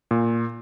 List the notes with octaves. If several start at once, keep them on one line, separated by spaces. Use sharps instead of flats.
A#2